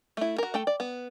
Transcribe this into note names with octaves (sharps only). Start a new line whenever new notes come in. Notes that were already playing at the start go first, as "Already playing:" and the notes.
A3 E4
F#4 A#4
A3 A4 G5
D5
B3